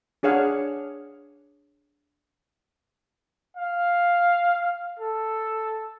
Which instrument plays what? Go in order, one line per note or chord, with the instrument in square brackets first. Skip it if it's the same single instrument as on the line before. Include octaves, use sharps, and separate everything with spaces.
[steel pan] D4 G#4 C#5 F5 F#5
[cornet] F5
A4